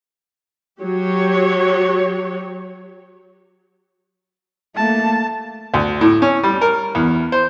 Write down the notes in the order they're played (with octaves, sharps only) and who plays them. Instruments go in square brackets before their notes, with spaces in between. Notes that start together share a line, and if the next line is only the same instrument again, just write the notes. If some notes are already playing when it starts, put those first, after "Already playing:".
[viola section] F#3 G4 C#5
[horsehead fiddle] A3 A#3 [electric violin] A5
[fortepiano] D2
A2
C#4
G3
A#4
E2
C5